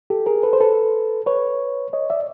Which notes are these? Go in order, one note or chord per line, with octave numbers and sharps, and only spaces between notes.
G4 A4
G#4 A#4
A4 B4
C5
A4 B4
B4 C#5
C#5 D#5
D5 E5